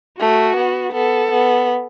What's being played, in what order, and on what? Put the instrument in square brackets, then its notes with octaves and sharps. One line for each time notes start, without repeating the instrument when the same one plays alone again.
[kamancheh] A3 [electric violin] F#4
[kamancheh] B3
[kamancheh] B3 [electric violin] A4
[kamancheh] B3